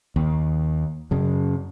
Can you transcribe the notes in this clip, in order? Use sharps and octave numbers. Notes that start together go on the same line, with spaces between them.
D#2
F#2 C#3